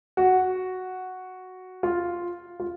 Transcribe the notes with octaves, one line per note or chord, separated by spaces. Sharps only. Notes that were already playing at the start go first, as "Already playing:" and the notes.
F#4
F4
F4